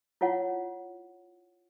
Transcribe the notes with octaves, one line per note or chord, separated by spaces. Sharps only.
E4 F4 C#5 F#5